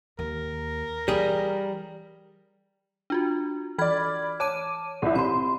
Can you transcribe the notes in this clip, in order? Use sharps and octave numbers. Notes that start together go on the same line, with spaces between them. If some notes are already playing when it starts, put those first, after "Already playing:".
D#2 A#4
E3 G3 G#4
D4 F4 F#4
E3 D5 B5 F6 G#6
C#5 A5 D6 D#7
C2 E4
C3 B5 C6